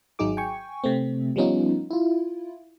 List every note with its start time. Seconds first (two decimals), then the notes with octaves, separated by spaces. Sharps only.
0.19 G#1 F#3 D#4 G#4 D6
0.37 G5 G#5 C#6
0.84 C3 A3 C4
1.36 F3 G3 B3 C#4 D#4 F4
1.91 E4 F4